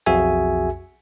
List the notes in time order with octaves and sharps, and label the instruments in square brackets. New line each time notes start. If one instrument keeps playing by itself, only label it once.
[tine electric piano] B1 F2 F#4 G#4 E5 G#5